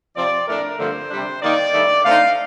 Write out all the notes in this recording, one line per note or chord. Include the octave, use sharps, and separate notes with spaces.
C3 F3 C4 D5
A2 A3 D4 A#4
G2 D3 F3 A3 C4 C5
C3 G3 D4
D#3 A#3 D#4 D5
G2 D#3 A3
D3 A3 C4 D#4 F5